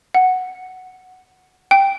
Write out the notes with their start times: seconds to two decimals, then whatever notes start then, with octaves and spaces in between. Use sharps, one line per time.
0.14 F#5
1.71 G5